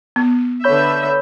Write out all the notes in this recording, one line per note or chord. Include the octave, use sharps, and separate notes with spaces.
B3
D3 B4 C#5 E5 B5 G6